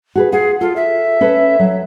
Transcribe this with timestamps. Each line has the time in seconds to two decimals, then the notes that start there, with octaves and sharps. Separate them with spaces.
0.15 F#4 G#4 B4
0.32 F4 G#4 F#5
0.61 F4 A4
0.76 E5
1.21 C#4 A4 B4
1.59 F#3